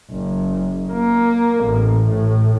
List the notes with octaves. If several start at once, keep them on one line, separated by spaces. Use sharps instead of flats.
F#1
A#3
A1
A2